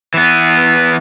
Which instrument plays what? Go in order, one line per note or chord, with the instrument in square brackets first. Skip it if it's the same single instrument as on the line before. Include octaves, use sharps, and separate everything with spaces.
[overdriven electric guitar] E3 B3